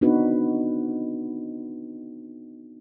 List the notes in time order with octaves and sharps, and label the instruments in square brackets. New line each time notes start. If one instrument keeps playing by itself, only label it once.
[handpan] B3 C4 D4 D#4 F#4 B4